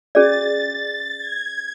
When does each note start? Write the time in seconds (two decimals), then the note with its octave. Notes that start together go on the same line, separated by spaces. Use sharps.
0.15 C#4 G#4 D5 A6
1.17 G#6